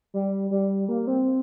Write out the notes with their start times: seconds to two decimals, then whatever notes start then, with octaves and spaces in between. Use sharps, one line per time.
0.14 G3
0.51 G3
0.89 A#3
1.07 C4